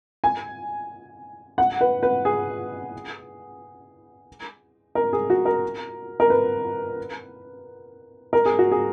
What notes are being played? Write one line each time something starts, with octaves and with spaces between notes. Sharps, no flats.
G#5
F#5
B4
B4
G#4
A#4
G#4
F#4
A#4
A#4
B4
A#4
G#4
F#4
G#4